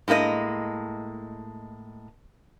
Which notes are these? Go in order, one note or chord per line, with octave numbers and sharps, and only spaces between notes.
A2 G#3 A#3 E4 D#5